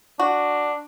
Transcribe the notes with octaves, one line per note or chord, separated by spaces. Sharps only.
D4 F#4